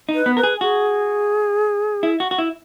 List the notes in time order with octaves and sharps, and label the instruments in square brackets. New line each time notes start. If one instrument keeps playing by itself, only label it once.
[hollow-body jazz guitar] D#4
[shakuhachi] B4
[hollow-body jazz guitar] B3
[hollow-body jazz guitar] A#4 [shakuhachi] B4
[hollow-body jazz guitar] G#4
[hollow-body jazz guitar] F#4 [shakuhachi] G#4
[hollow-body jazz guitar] E4
F#4
F#4
E4